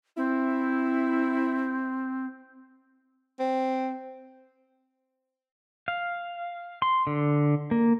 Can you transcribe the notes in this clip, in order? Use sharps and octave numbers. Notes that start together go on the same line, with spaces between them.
C4 E4
C4
F5
C6
D3
A#3